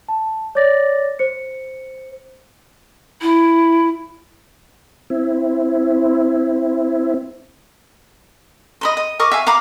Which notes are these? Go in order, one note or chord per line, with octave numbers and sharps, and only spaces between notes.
A5
C#5 D5 D6 A6 A#6
C5 C#7
E4
C4 E4
D#5 B5 C6
D#5
A#4 D#5 C#6 D6
E5 F5 G#5
F5 A#5 B5 D6